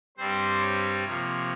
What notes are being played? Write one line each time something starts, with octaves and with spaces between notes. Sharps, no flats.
G2 G3 C4 C5
C#5
C3 F3 A#3